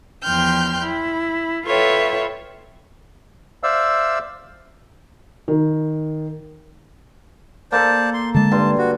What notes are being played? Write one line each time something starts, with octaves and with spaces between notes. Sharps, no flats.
E2 F3 G5 C6 F6 G6
E4
F4 A4 B4 C#5 E5 G5
C5 D5 E5 F5 E6
D#3
A#3 A4 C5 D5 A5
C6
D3 G#3 A5
G2 C6
F#4